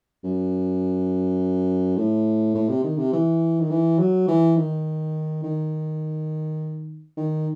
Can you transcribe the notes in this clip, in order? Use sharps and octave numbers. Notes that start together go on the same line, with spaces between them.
F#2
A2
A2
C3
D#3
C3
E3
D#3
E3
F#3
E3
D#3
D#3
D#3